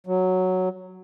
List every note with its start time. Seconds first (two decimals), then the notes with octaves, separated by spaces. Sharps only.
0.07 F#3